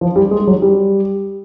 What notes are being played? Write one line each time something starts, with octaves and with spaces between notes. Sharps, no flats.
F3
G3
G#3
F#3
G3